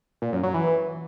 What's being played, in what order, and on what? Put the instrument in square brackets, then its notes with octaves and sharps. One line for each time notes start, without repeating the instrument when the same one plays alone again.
[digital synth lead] A#2
F#2
F#3
E3